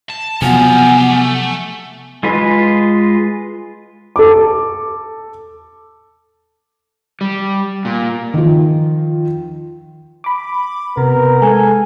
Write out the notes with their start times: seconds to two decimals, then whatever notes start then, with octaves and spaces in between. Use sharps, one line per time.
0.09 A5
0.42 C3 F3 F#3 B3 G4 F5 G#5
1.10 A3
2.23 G#3 F4 B4
4.16 A4 D6
7.21 G3
7.85 A#2
8.34 D#3 F3
10.24 B5 D6
10.97 C3 B3 A#4
11.42 G#3 A4 G#5